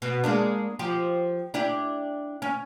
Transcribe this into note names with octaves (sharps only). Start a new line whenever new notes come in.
B2
G#3 A#3 D4
F3 G4
D4 E4 G4
C#4